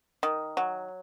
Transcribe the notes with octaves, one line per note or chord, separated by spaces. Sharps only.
D#3
F#3